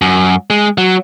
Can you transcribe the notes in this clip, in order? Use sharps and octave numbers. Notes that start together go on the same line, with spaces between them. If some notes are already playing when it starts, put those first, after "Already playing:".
F#2
G#3
F#3